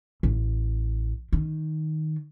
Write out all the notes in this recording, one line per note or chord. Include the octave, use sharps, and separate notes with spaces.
A1
D#3